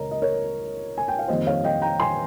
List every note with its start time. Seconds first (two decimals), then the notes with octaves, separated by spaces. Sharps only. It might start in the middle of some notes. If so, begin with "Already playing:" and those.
Already playing: C#2 A#4 C#5 D#5 A#5
0.11 D#5
0.22 A#4 C#5
0.98 G#5
1.08 G5
1.19 F5
1.28 F2 D#3 G3 A#3 C5 D#5
1.47 C#5 F5
1.64 D#5 G5
1.82 G5 A#5
2.00 G#5 C6